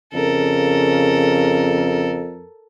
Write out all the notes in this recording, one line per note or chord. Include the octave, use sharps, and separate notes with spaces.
F2 C#3 A4 A#4